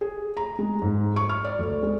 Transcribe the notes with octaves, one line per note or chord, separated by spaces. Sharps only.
G#4
A#5
G#3
G#2
C#6
F6
D5
D2
G#3